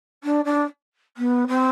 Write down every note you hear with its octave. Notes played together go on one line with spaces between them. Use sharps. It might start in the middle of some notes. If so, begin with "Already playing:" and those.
D4
D4
B3
C4